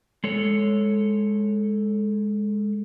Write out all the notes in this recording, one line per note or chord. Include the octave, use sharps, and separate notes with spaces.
G#3 A4 C#5